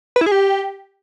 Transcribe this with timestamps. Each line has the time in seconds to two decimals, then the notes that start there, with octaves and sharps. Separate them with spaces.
0.16 B4
0.21 E4
0.26 G#4
0.32 G4